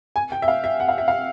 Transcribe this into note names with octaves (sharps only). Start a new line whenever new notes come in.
G#5
G5
E5
F5
E5
F#5
F5
E5
F5